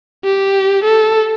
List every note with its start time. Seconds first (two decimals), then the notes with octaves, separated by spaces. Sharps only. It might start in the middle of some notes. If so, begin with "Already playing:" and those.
0.25 G4
0.85 A4